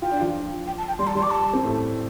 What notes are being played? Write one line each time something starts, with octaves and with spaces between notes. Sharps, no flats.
F4 G5
D4
F3 F4
G5
A5
G5
G3 C6
A5
G3 C6
D6
A5
C4
A2 A3